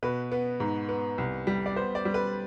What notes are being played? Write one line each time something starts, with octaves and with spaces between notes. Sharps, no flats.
B2 B4
B3
G#2
B3
C2
G3
D5
B3 C5
D5
G3
B4